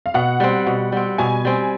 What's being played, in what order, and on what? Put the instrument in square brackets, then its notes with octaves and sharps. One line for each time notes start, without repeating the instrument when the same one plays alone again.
[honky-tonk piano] F5
[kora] B2 [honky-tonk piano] F#5
[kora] G3 C4
B2
G3 C4
[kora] B2 [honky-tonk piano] G#5
[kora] G3 C4